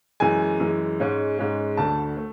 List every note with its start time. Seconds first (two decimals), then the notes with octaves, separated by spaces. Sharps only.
0.20 F#2 E3 G#3 G#5
0.60 F#2 E3 G#3
1.00 G#2 G#3 C#4
1.38 G#2 G#3 C#4
1.77 D2 D3 A3 A5
2.17 A3